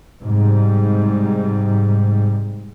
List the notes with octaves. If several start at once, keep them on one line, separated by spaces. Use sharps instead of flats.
G#2 C3 G3